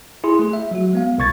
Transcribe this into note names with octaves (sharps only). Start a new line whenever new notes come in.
E4 G#4 C6
A3 G#4
E5
F#3 F#4
G#3 B3 F5
C2 B2 C#6 G#6 A6